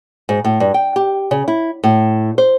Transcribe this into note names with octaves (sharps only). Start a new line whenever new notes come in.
G#2
A2
G2
G5
G4
C#3
E4
A2
C5